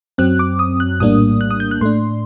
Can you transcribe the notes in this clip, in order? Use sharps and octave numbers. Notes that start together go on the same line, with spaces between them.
F#2 F#3 C4 F#6
D6
D#6
F#6
A#1 A2 G3 A#3 D4 D#6
F#6
D#6
G6
F#6
A2 A3 D4 C6